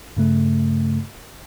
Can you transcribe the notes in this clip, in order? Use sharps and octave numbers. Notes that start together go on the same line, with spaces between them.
G2 C#3 A3